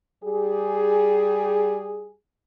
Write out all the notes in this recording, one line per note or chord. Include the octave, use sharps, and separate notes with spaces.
G3 G4 G#4